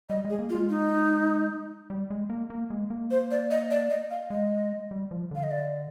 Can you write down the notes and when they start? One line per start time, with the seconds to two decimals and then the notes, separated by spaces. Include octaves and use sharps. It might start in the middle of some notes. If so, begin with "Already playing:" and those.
0.09 G3 D#5
0.25 G#3
0.30 G#4
0.39 A#3
0.50 F4
0.55 G#3
0.69 D#4
1.90 G3
2.10 G#3
2.30 A#3
2.50 A#3
2.70 G#3
2.90 A#3
3.11 C5
3.31 D5
3.51 D#5
3.71 D5
3.90 D#5
4.10 F5
4.30 G#3 D#5
4.91 G3
5.11 F3
5.31 D3 F5
5.43 D#5
5.51 D5